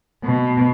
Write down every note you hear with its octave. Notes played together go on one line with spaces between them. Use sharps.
B2